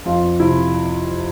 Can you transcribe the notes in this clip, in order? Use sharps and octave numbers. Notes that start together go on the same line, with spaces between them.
F2 F4
C3 E4